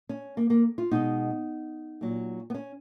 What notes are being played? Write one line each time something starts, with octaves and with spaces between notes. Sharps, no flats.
C#4
A#3
A#3
F4
B2 G#3 D#4
A#2 F#3
B3
C#4